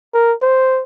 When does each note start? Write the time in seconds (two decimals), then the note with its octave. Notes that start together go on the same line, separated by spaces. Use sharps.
0.14 A#4
0.42 C5